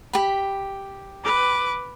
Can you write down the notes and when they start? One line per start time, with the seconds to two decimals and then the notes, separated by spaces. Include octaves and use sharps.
0.13 G4 B5
1.24 B4 D6